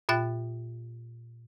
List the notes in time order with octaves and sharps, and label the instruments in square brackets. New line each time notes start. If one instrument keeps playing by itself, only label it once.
[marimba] A#2 F4 E5 G5 F#6 A6